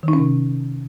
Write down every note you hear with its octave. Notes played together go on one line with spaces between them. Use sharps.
D#3
D#4
C#4
C3